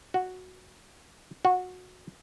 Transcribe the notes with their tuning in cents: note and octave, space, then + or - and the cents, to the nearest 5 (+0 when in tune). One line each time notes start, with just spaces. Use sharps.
F#4 -5
F#4 -20